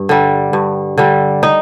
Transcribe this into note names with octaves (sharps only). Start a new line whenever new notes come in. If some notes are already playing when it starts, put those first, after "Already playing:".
Already playing: G2
D3 G3
G2
D3 G3
D#4